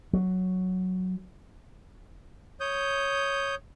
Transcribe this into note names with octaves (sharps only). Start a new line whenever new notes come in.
F#3
C#5 D#6 G6